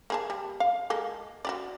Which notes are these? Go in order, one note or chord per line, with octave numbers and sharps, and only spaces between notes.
A#3 G#4 A5
G3
F5
G#3 A#3 A4
F#4 G4 D5